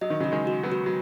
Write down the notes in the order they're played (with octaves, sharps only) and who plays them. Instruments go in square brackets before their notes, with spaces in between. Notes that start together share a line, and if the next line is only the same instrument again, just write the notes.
[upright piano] F#3 [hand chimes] D#5
[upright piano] D#3
[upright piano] C#3 F#3 [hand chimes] F#4
[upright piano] D#3 G#3
[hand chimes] F#4
[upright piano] F#3 B3
[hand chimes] F#4
[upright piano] F#3